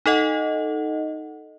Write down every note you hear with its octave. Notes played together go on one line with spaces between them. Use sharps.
D#4 A4 D#5 F#5